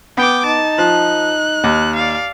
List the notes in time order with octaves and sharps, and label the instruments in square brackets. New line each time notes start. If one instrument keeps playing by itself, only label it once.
[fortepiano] B3 [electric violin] G5 D6
[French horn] D#4 [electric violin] A5
[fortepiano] F3 [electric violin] F#6
[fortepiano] D#2
[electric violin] D5 F5